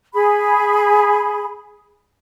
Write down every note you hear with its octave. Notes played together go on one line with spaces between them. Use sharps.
G#4 B5